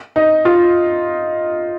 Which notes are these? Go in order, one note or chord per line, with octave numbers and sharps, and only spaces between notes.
D#4
F4